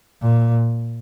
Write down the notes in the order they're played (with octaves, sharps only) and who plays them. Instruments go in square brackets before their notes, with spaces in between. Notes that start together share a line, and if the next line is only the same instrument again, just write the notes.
[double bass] A#2